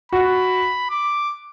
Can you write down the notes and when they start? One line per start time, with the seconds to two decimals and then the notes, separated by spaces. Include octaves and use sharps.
0.12 F#4 B5
0.90 D6